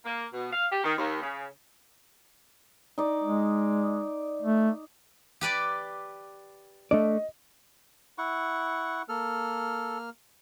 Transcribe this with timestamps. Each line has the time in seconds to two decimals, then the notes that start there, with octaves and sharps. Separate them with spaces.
0.05 A#3
0.34 B2
0.52 F5
0.72 G4
0.84 D#3
0.98 D#2
1.23 C#3
2.98 D#4 D5
3.24 G#3
4.42 A3
5.41 G4 B4 D5
6.91 A3 D4 D5 D#5
8.18 E4 F#5 C#6
9.09 A#3 A4 F6